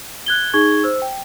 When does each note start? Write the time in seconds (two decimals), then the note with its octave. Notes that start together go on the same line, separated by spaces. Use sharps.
0.26 F#6 G#6 G7
0.53 D#4 G#4 C#6 G#6 G7
0.83 C5 E6
1.02 G5